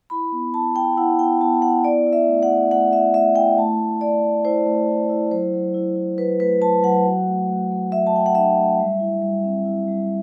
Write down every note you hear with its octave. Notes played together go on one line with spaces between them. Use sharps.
E4 B5
B3
E4 A5
E4 G5
E4 F#5
B3 G5
B3 A5
B3 F#5
E4 D5
E4
E5
A3
F#5
A3
A3 F#5
E4 E5
A3 E5
E4 G5
A3 A5
A3
A3 D5
A3
E4 C5
A3
E4
E4
F#3 C5
F#3
E4
E4
F#3 B4
A3 B4
F#3 A5
F#3 F#5
F#4
A3
A3
A3
A3 E5
A5
A3 G5
F#5
D4 E5
A3
G3
E4
G3
C4
E4
G3